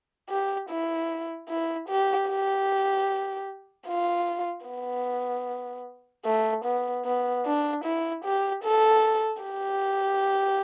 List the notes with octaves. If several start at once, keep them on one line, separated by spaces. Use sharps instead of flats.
G4
E4
E4
G4
G4
F4
B3
A3
B3
B3
D4
E4
G4
A4
G4